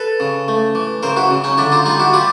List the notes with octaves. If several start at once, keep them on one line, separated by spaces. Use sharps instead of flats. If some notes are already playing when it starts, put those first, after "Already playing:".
Already playing: A4 B4
C#3
A3
E3
C#3 A#4 C5
E4 F#4
C#3
C#4 D#4
D3 D4 E4
D#4 F4
G3 D#4 F4
E4 F#4
G3 F4 G4